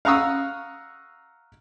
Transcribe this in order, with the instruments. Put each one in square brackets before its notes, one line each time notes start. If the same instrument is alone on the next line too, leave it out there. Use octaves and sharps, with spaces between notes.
[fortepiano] F5 F#5 A#5 C#6 D#6 E6